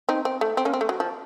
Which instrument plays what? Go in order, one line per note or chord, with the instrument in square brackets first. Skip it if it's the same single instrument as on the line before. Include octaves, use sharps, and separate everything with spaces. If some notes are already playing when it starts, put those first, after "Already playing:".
[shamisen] C4 D#4
C4
A3
C4
A#3 C#4
C4
A3
F#3
F3